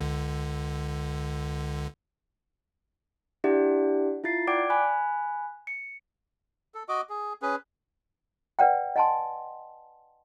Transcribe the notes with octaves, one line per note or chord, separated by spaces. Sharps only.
C#2 D3
D4 E4 G4 D5 F#5
E4 F4 A6 C7
D5 F#5 G5 D6 G#6 D7
G#5 B5 F#6
C#7
A4
F#4 D#5 D6
G#4
C#4 G#4 B4
B4 D5 F#5 G5
D#5 F#5 G#5 A5 C6